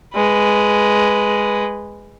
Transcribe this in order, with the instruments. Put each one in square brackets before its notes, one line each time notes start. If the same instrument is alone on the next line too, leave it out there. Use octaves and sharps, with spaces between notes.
[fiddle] G#3 B4